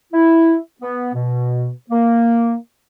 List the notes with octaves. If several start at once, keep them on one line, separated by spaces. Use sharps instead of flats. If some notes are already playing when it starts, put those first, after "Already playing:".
E4
B3
B2
A#3